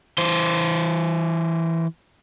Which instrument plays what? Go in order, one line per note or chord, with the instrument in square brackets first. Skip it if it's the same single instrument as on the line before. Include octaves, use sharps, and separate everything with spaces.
[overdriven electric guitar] E3 C5